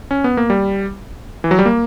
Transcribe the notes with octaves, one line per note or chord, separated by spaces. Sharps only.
C#4
B3
A#3
G3
E3
F#3
G3
A#3